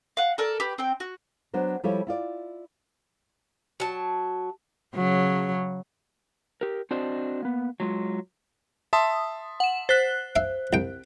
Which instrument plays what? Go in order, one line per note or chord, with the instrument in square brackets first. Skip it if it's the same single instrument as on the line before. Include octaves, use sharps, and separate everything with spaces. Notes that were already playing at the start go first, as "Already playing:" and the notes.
[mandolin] F5 F#5
A4 A#4 D5
G4 B4
C4 G5
F#4
[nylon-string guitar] F#3 B3 D4 F#4 C5
F3 G3 E4 G4 A4 C#5
E4 F4 D5
[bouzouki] F#3 A5
[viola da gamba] C#3 F#3
[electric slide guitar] G4 A#4
C4 D4 F#4 C5 D5 D#5
A#3 B3
F#3 G#3 F4
[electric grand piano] E5 A5 C6 [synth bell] D#6
[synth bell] F#5 E7
[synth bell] C5 F#6 [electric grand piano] A6 B6
[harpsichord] E5 F5
C2 G5